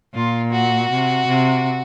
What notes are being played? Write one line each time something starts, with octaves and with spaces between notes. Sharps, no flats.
A#2 F4
F#4
C3
C3